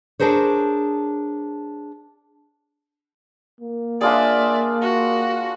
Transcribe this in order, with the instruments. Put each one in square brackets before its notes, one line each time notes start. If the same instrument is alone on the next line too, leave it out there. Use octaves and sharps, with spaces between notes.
[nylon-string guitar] D4 G#4 A#4 C5 C#5
[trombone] A#3
[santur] D4 F4 G#4 [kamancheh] D5 E5
[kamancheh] F#4